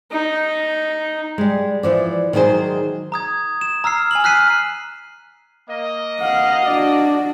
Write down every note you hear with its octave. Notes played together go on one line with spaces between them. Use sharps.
D#4
G3 G#3
E3 F3 D5
D#3 F#3 G#3 G#4 C5
A#5 D#6 G#6
E7
A#5 E6 F6 C7
G#5 F#7
F6 F#6 B6 C7 D#7
A#3 D#5
F5 F#5
D4 F#4 D5